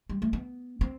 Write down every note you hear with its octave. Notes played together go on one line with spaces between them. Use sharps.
G3
A3
B3
C4